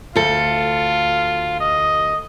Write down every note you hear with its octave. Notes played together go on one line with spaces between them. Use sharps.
D2 F4 A4
D#5